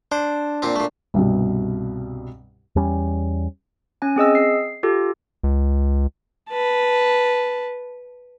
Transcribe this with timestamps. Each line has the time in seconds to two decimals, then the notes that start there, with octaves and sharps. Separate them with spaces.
0.12 D4 C5
0.62 A#2 C4
0.76 A#2 A3
1.14 C2 G2 B2
2.76 E2 G3 C#4
4.02 C#4 G#5
4.16 C4 G#4 D#5 E6
4.35 C7
4.83 F4 G4 A4
5.44 C#2
6.50 B4 A5